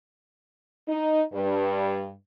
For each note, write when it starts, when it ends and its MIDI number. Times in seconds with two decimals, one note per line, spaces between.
0.88 1.22 63
1.33 2.12 43